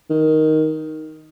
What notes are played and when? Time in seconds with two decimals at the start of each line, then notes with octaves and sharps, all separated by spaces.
0.10 D#3